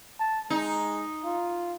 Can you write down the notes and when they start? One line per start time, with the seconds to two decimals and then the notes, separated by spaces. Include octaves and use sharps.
0.20 A5
0.50 G#3 D#4
1.25 F4